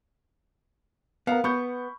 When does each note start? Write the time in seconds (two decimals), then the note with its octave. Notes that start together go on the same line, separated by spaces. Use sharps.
1.27 B3 A#4 F5
1.44 B3 B5 C#6 G6